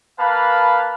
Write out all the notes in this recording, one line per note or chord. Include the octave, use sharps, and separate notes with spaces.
A#3 B4 F5 A5 B5